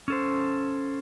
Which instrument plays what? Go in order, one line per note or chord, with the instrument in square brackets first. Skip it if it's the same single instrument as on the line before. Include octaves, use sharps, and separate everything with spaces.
[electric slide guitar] C#4 A4 C5